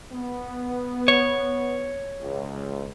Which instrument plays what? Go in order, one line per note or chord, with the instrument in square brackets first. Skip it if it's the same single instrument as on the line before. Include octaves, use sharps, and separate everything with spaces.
[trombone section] B3
[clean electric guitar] C#5
[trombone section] C#2